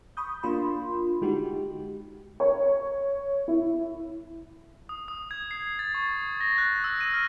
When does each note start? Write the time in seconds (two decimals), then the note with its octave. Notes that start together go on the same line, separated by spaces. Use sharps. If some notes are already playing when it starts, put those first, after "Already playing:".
0.17 B5 C#6 D#6 G6
0.43 A#3 D4 F4 B5 C6
1.21 D3 G#3 D#4 F#4 G4
2.40 C#5
3.48 E4
4.89 D#6
5.08 D#6
5.31 G#6
5.51 C7
5.79 A6
5.94 C#6
6.41 A#6
6.58 F#6
6.84 E6
7.01 D#7
7.14 F6